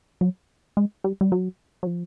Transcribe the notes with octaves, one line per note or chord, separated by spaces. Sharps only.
F#3
G#3
G3
G3
F#3
F#3
F3